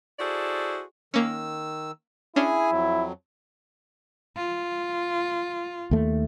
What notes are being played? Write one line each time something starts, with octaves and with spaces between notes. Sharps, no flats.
E4 F#4 G#4 A4 C5 D5
D#3 A#3 C#4 E6
C#4 D4 E4 G#4 G#5
F2 F#3
F4
D#2 A3